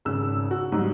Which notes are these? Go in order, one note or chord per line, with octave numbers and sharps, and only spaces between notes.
G#1 C#3 E6
F#4
G#2 F#3 G3